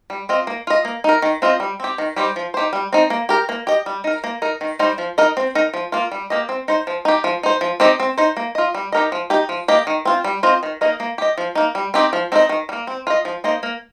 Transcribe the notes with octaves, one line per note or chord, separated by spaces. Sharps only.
G3
C4 F4 D#5
A#3
F4 D#5
A#3
D#4 A#4
D#3
C4 F4 D#5
G3
C4 G4
D#3
G3 D#4 G4 C5
F3
D#4 G4 C5
G3
C4 D#4
A#3
G4 A#4
A#3
G4 D#5
G3
D#4 A#4
A#3
D#4 A#4
D#3
G3 D#4 C5
F3
D#4 A#4 D#5
C4
D#4 A#4
F3
A#3 F4
G3
A#3 G4 D#5
C4
D#4 C5
F3
D#4 G4
F3
D#4 C5
F3
C4 D#4 G4 D#5
C4
D#4 C5
A#3
F4 D#5
G3
D#4 G4 A#4 D#5
F3
D#4 G4
F3
A#3 G4 D#5
D#3
C4 F4
G3
C4 F4 C5 D#5
D#3
A#3 D#4 A#4 D#5
A#3
G4 D#5
F3
A#3 D#4
G3
C4 D#4 G4
F3
C4 D#4 A#4 D#5
D#3
G3
A#3
C4
F4 C5 D#5
F3
A#3 D#4 C5 D#5
A#3